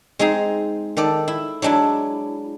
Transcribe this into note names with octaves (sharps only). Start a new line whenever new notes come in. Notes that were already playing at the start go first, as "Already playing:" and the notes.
G#3 C4 D#4 G#4
D#3 A4 D5
E4
F#3 G#3 D4 E4